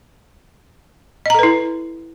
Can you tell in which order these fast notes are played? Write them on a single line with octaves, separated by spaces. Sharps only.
D#5 A#5 A4 B4 E4